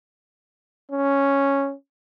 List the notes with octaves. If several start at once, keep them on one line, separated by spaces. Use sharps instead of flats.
C#4